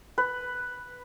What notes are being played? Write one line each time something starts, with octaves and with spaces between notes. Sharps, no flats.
B4